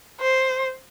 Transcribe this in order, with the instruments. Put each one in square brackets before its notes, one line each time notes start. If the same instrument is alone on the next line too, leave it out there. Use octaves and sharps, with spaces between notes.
[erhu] C5